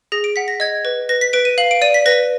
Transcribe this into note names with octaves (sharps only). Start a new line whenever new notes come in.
G#4 A#6
D7
F#5 B6
A#6
D#5 G#6
B4
B4 A#6
B6
B4 D7
D#7
F5 F#7
D7
D5 D#7
B6
B4 A#6